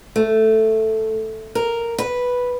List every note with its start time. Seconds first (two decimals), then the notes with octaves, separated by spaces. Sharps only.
0.16 A3
1.55 A#4
1.98 B4